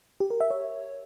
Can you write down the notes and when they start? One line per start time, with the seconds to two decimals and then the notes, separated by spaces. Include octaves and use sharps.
0.20 G4
0.30 A#4
0.40 E5
0.50 C#5